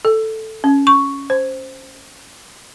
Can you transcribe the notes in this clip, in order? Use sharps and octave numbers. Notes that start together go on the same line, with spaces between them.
A4
C#4
C#6
C5